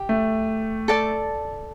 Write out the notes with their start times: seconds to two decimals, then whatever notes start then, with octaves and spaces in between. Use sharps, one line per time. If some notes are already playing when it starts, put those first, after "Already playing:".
Already playing: G4
0.09 A3
0.88 A4 D5 A5